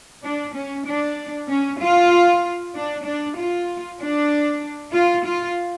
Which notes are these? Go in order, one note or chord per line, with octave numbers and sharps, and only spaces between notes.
D4
C#4
D4
C#4
F4
D4
D4
F4
D4
F4
F4